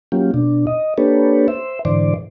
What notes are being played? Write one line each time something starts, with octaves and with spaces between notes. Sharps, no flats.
F#3 A#3 C#4 F4 G4
B2 D4
D#5
A#3 D4 G4 A4 B4 C#5
C5 E5
G#2 D3 E3 C5 D5